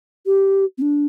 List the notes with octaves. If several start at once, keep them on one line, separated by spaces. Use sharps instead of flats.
G4
C4
D4